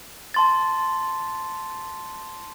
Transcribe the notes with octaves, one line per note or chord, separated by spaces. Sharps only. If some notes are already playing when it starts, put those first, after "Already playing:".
A5 C6 A6